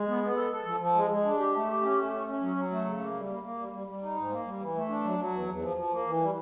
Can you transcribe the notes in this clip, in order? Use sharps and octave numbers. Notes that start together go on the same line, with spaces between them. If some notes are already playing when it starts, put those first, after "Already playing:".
Already playing: G#3
B3
B3
A4
A4
F3
F3
G#3
G#3
D4
G4
A3
G4
C#4
A3
C#4
C#4
F#3
F#3
A3
C#3
A#3
G3
A#3
A#3
G3
G3
G3
D#4
G#2
A#3
G3
E3
A3
D4
F#3
F#3
E2
E2
F3
F3
A#3
E3
G3